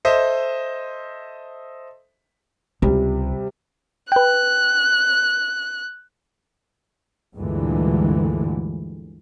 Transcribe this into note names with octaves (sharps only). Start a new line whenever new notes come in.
A4 C5 D#5 E5
C#2 C3 G3
B4 G5 F#6
D2 G2 A#2 D3 E3 G#3